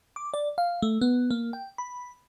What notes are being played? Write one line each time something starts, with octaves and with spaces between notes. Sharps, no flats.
D6
D5
F5
A3
B3
A#3
G5
B5